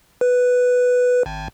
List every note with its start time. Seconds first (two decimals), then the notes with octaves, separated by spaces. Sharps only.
0.21 B4
1.26 G#1